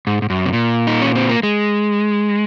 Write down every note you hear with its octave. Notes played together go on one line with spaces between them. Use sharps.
G#2
G#2
F#2
C3
A#2
D#4
C#4
C4
A#3
G#3